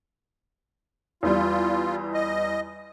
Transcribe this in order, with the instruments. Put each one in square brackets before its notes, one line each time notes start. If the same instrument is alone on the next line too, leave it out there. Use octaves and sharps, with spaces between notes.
[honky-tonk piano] E2 G3 [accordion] F4
[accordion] D#5